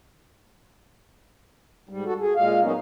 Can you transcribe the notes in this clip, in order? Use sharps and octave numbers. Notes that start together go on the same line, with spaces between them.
G#2 G3
F#4 A4
G#4
A#2 G#3 F5
F#3 A#3 B3 C#4 D#4